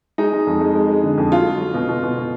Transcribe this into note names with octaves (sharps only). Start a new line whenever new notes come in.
G#3 D#4
G#3
F2
G#3
G#3
G#3
D3
F2
F#3 F4
F#3
F#3
B2
B2
B2
B2